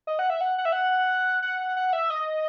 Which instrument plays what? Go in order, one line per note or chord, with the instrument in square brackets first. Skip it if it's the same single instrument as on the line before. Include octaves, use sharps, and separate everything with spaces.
[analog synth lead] D#5
F#5
E5
F#5
F#5
E5
F#5
F#5
F#5
E5
D#5